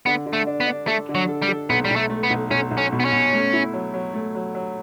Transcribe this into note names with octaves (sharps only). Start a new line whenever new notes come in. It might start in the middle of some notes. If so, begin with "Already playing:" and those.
D3 B3
D3
A3
D4
B3
D4
A3 A4
D3
F#3
A4
G3
A4
B1 B3
G3
B1
A3
A3
B3
B1
B1 C#4
B1
C#4
B2
B3
C#4
B2
A3
E4
F#3
F#3
A3
F#3
F#3